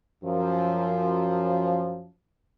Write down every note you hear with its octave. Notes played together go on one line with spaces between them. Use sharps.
F#2 F3